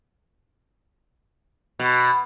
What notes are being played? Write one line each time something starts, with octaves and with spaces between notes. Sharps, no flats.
B2